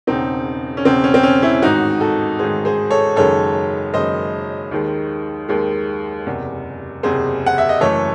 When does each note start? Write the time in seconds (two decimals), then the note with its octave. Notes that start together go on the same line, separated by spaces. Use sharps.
0.07 E1 E2 C#3 C4 D#4
0.77 C#4
0.85 E1 E2 C#3 C4
1.04 C#4
1.14 C4
1.23 C#4
1.42 C#4 E4
1.62 A1 G#2 D#3 D#4 F#4
2.00 F#4 A4
2.39 A1 G#2 D#3 G#4 C5
2.65 G#4 C5
2.90 A4 C#5
3.16 F#1 F#2 D#3 G#3 A4 C#5
3.94 F#1 F#2 D#3 G#3 C5 D#5
4.71 D#2 D#3 G#3
5.48 D#2 D#3 G#3
6.26 F#1 E2 C3
7.03 F#1 E2 C3 G#4 C5
7.46 F#5
7.58 E5
7.69 D#5
7.80 F#1 F#2 E3 A3 A4 C#5